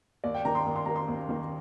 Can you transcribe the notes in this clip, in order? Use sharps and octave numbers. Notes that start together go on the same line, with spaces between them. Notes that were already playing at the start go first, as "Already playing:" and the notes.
D#2 D5
G5
D#3 A#3 A#5
C6
D#2
C6
D#3 A#3 A#5
C6
D#2
D#3 A#3